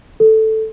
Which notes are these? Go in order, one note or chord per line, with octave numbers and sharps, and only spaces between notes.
A4